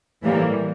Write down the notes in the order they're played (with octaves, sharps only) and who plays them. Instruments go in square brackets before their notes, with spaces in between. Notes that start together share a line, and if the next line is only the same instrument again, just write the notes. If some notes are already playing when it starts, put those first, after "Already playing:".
[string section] A2 E3 G3 A#3